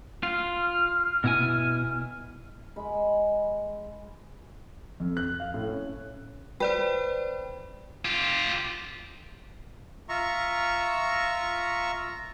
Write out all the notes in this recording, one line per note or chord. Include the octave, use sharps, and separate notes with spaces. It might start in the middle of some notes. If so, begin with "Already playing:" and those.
F4 F6
B2 E4 G#5
G#3 B5
F2
F#6
F5
A2
C#4
B4 C5 D5 G5
F4 G4
F4 E5 A#5 C#6